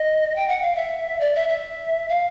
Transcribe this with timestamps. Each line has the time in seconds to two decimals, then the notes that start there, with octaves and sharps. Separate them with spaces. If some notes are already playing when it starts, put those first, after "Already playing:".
Already playing: D#5
0.36 G5
0.48 F#5
0.62 F5
0.76 E5
1.20 D5
1.35 E5
1.49 E5
2.09 F5